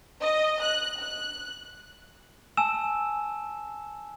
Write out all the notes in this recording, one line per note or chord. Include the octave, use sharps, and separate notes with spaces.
D#5
F#6
F#6
G#5 A5 E6 E7